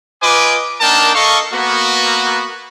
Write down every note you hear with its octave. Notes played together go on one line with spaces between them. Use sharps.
F4 B4 D#5 G#5 D6
A#3 D4 D#4 A#4 G5 A5
A4 A#4 D#5 F5 C#6
A#3 B3 F#4